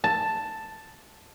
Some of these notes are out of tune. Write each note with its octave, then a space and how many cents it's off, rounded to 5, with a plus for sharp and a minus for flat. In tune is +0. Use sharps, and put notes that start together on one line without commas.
A5 +5